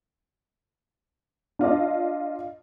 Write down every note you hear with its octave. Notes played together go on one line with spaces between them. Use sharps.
D4 F4 D5 D#5